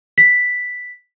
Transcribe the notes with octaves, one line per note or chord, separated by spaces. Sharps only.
B6